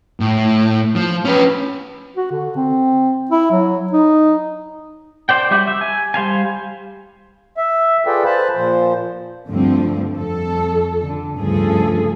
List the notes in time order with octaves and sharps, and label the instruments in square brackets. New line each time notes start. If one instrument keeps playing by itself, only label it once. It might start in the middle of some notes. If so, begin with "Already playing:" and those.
[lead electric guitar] A2
F3
C#4 B4
[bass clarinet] F#4
D3
C4
E4
F#3
D#4
[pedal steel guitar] C5 D5 G5
G3 F#4 E5 D6 G6
E5
G#5
G3 C5 F5 G#5
[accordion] E5
F4 G#4 A4 B4 D5 G5
B4 C5 A5 B5
A#2 F3 C5
[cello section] D2 G2 D3 F3 G3 C4
F2 A4
D3
D2 G2 C#3 F3 G#4 A4